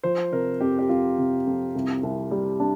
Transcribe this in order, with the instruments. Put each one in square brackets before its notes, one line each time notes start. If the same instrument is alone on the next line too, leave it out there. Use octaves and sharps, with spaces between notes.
[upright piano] F3 [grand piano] C5
[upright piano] C3 [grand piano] A#4
[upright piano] F2 [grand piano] G4
[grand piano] G4
[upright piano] F2 [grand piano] F4
[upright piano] C3
F2
C2
C2
G3
D4